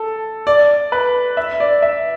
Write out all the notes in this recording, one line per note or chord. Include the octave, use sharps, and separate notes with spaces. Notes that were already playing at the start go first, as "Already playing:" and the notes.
Already playing: A4
D5
B4
E5
D5
E5